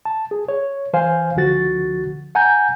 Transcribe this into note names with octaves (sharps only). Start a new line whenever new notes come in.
A5
G#4
C#5
E3 C5 F5 G#5
C#2 D3 F3 F#4 A6
F#5 G#5 A#5 G6